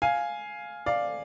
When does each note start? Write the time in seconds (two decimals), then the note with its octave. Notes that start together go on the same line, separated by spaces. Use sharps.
0.02 F5 G#5
0.86 D5 F5